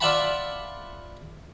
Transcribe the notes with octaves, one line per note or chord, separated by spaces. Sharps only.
F4 D5 E5 F#5 A5 B5